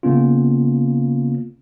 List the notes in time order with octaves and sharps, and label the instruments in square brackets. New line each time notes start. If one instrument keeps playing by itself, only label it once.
[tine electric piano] C#3 A#3 B3 C#4 F4